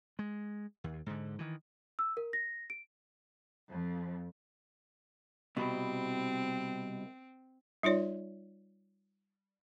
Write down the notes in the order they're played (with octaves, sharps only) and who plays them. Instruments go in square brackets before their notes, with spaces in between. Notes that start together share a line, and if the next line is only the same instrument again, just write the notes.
[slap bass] G#3
D#2
G#2 D3
D#3 E3
[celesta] E6
A#4
A#6
D7
[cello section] F2
[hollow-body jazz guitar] C2 B2 [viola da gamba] C4
[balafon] G3 D#4 F4 C#5 D5